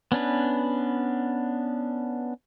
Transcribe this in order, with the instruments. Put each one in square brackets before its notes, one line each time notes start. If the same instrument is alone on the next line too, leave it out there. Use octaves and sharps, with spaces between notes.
[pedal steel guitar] B3 C#4 D4 B4